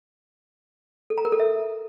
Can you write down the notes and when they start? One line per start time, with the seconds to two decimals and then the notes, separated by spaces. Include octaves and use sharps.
1.10 A4
1.18 A#5
1.25 A#4
1.32 A4
1.40 E5